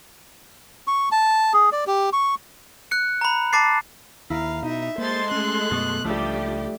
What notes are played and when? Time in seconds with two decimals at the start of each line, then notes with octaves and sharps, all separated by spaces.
0.87 C#6
1.12 A5
1.53 G#4
1.72 D5
1.87 G4
2.13 C#6
2.91 F#6 C#7
3.21 A#5 B5
3.53 A5 D6 A6 C7
4.30 D#2 E4 F5 A#5 D7
4.62 B2 D#4 E5
4.98 G#3 A#3 A4 C5 C6 A6
5.31 A3 C#4 F#6
5.71 F#2 B2 B3 C#6 D#6 A6
6.04 C#2 F3 G3 A3 D4 G4 D5 E5